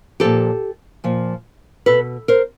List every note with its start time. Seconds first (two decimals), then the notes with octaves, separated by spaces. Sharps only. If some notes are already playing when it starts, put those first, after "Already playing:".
0.20 A#2 F3 G4 A4
1.04 A#2 F3
1.86 B2 A4 B4
2.28 A#4 C5